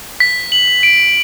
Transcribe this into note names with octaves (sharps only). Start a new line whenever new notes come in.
B6
F#7
D7